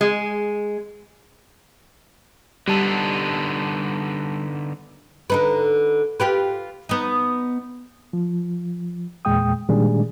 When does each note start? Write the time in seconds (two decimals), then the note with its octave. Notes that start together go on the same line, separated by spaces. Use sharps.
0.01 G#3
2.68 D3 G3 B3 D#4 A5 E6
5.30 D3 D#4 B4
6.20 F4 G4 B4
6.89 B3 D#4
8.13 F3
9.25 E2 A#2 G#3 G5 D#6
9.68 A#2 D#3 G3 G#3 D4 G#4